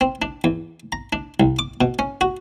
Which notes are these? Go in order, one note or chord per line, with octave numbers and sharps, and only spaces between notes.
C4
D4
E2
A#5
D4
C2
D6
B2
C#4
F#4